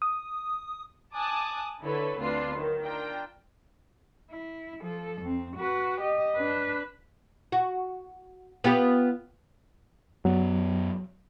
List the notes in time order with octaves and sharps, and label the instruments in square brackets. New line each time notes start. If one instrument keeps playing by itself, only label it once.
[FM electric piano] D#6
[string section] G#5 A5 D6 D#6 F#6
D3 E4 A4 B4 C#5
D2 C4 D4 F4 B4 C7
D#3 F#3
D4 F4 G5 A#5
[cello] E4
F3 A4
F2 C4
F#4 B4
G4 D#5
D4 B4
[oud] F#4
B3 F4 G4
[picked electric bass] F#2 B3 [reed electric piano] F#3